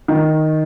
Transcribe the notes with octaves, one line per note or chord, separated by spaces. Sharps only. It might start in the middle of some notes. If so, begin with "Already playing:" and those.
D#3